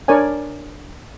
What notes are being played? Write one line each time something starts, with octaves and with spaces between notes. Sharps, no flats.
D4 A#4 C#5 D5 G#5